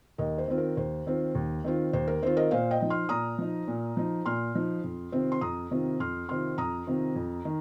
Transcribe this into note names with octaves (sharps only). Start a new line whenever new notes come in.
D#2 A#4 D#5
C5
D#3 C4 F4
A#4
D#2 C5
D#3 C4 F4
D#2
D#3 C4 F4
D#2 C5
A#4
D#3 C4 F4 C5
A#4 D#5
A#2 C5 F5
D#5 G5
F3 D#4
C6 F6
A#2 A#5 D#6
F3 D#4
A#2
F3 D#4
A#2 C6 F6
F3 D#4
F2
C3 D#3 C4 F4
C6
F2 A#5 D#6
C3 D#3 C4 F4
F2 C6 F6
C3 D#3 C4 F4 C6 F6
F2 A#5 D#6
C3 D#3 C4 F4
F2
D#3